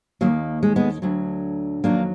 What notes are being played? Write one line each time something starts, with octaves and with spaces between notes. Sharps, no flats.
D#2 D#3 F#3 A#3
G#3
G#3 B3
D2 D3 F#3
F2 D#3 F#3 A#3 D4